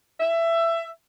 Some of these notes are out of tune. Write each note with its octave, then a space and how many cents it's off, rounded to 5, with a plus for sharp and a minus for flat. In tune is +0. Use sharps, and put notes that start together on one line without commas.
E5 +15